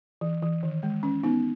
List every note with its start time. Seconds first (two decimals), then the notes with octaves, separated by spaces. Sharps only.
0.21 E3
0.42 E3
0.63 D#3
0.83 G#3
1.03 C#4
1.23 B3 D#4